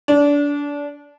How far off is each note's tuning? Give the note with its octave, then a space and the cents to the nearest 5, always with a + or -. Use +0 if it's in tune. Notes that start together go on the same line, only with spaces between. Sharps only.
D4 -25